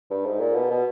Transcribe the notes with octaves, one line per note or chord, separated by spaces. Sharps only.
G2
G#2
A#2
B2
B2